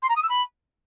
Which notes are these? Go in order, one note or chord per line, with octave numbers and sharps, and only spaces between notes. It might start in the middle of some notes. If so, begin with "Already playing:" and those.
C6
A#5
D#6
E6
B5